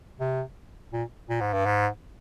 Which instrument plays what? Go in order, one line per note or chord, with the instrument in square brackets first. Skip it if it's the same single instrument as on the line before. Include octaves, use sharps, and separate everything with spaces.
[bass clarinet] C3
A#2
A#2
G#2
G2
G#2